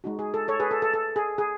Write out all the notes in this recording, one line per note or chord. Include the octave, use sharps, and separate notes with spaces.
G#3 D#4 F#4
G#4
A4
A4 C#5
G#4 B4
A4
A4
A4
G#4
G#4